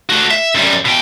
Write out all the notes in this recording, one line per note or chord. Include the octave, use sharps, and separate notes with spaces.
A3 F#4
E5
F#2 G3
B2 G5